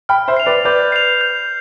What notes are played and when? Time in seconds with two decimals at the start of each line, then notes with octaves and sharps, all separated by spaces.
0.09 G5 B5 F6
0.28 C5 E5
0.37 C7 F7
0.46 B4 D5
0.65 B4 D5 G6
0.92 C7 F7
1.21 G6